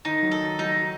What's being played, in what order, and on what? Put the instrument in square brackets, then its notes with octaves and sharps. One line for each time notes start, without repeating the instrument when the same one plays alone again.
[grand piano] D#3 [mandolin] D#4
[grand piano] F#3
[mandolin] A4
[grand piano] F#3 [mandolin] D#4